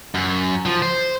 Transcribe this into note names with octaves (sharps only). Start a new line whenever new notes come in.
F#2
F3
C5